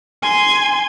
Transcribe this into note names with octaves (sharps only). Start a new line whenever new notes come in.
G#5 C6